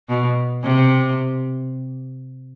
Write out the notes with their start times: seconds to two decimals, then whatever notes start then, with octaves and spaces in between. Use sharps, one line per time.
0.09 B2
0.63 C3